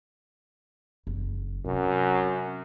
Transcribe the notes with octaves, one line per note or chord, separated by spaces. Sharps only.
F#1
F#2 C3